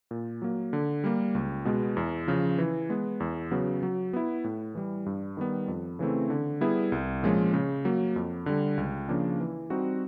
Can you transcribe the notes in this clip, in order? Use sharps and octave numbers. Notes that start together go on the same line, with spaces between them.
A#2
F#3 A#3
D3
G3 A#3
C#2
B2 G#3 B3
E2
C#3 F3
E3
G#3 B3
E2
C#3 F#3 B3
F#3
B3 E4
A2
E3 G3
G2
D#3 G3 B3
F2
C#3 E3 A3 C4
D3
G3 B3 E4 G#4
C2
A#2 F3 G#3 C#4
C#3
F#3 A#3
F2
D3 G3
C#2
C#3 F3 A#3 D4
E3
G3 C4 D#4 F#4